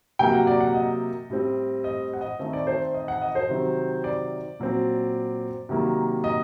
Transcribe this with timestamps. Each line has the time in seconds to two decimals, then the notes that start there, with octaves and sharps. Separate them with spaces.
0.19 C3 F#3 A#3 G5
0.33 F#5
0.47 D5
0.60 F#5
0.74 D#5
1.29 A2 G3 C4
1.84 D#5
2.13 F#5
2.21 D#5
2.39 D#3 A3 C4 D#5
2.53 D5
2.67 C5
2.94 D#5
3.08 F#5
3.22 D#5
3.35 C5
3.49 C3 D#3 F#3 C4
4.04 D5
4.59 A#2 F#3 C4
5.69 C3 D#3 F#3 A#3
6.24 D#5